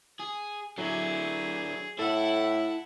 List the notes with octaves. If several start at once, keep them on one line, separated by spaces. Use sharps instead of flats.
G#4
D3 F#3 E4 G#4
A2 E4 A4 F#5